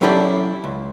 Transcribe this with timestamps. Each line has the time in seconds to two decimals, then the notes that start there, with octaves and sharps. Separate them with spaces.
0.01 F#3 C#4 E4 G4 A4 D5
0.64 C#2